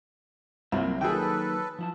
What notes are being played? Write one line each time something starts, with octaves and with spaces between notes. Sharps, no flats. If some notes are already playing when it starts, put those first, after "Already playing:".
C2 C3 F#3 A#3
D#3 F#3 A#3 G#4 A4 B4 G5
F3 E4 A5